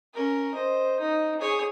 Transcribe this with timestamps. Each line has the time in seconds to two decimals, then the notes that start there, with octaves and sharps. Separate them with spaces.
0.14 C#4 A#4
0.55 C5 D#5
1.00 D#4
1.40 G#4 C#5